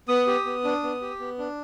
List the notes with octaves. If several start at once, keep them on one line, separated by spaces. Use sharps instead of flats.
B3 D#6
G4
B3
D4
B3
G4
B3
D4